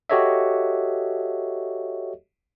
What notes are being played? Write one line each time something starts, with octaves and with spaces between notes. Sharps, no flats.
F#4 G4 A4 C#5 D#5 E5